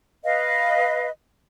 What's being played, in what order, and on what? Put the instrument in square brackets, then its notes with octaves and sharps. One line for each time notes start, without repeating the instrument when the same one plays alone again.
[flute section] B4 D#5 F5